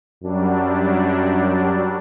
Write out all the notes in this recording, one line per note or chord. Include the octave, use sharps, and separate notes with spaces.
F#2 F#3 G3 D4